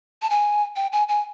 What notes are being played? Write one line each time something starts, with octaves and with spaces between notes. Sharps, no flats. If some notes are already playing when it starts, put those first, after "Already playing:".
A5
G#5
G5
G#5
G#5